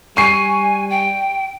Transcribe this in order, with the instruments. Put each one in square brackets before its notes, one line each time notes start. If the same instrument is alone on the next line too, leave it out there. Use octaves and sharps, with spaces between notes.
[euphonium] G3 [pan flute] G#5 [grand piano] C#6 C7
[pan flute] G5